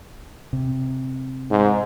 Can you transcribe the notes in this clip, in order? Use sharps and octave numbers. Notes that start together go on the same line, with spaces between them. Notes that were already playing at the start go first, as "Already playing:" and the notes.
C3
G#2